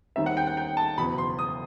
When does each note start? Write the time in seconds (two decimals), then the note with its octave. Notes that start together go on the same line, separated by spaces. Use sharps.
0.16 D#2 D#3 G3 C4 E5
0.26 F#5
0.37 G5
0.47 F#5
0.57 G5
0.77 A5
0.98 F#1 E2 B2 B5
1.18 C6
1.39 D#6